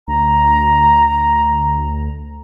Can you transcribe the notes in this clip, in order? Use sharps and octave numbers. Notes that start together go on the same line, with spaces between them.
D2 A#5